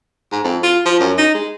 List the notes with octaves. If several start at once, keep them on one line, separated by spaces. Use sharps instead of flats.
G#2
F2
F4
F3
F#2
D#4
G#3